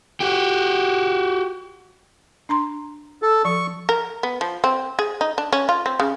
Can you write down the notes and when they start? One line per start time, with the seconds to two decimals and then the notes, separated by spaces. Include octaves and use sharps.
0.20 F#4 G4
2.49 D4 A#5 C6
3.22 A4
3.45 F3 C#6
3.89 A#4
4.23 B3
4.41 F3
4.64 C4
4.99 G#4
5.21 D#4
5.38 D4
5.53 C#4
5.69 F4
5.86 C4
6.00 C#3